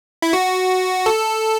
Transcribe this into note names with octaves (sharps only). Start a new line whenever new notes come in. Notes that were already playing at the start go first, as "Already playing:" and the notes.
E4
F#4
A4